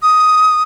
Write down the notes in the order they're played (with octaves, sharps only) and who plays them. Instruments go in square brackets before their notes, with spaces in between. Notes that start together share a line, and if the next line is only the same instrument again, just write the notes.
[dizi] D#6